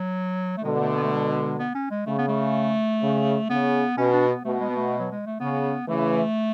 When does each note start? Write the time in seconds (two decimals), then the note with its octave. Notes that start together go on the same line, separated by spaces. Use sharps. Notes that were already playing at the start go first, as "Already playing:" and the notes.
Already playing: F#3
0.57 A3
0.64 B2 D3 G#3
0.80 A3
0.96 B3
1.03 A3
1.12 G#3
1.59 B3
1.75 C#4
1.91 G#3
2.06 C#3 A3
2.18 B3
2.28 A3
3.02 C#3
3.49 C#3 B3
3.97 B2 C#4
4.12 D4
4.29 B3
4.45 B2 A3
4.60 G#3
4.70 B3
4.76 A3
4.99 F#3
5.12 G#3
5.26 A3
5.40 C#3 B3
5.87 C#3 E3 A3